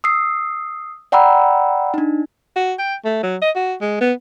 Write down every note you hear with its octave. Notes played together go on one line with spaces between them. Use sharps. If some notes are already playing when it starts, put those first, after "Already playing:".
D#6 E6 C7
D5 F#5 G5 A#5 B5 E6
D4 D#4
F#4
G5
A3
F#3
D#5
F#4
G#3
B3